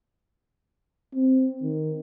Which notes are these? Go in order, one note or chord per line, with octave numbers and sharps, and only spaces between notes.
C4
D#3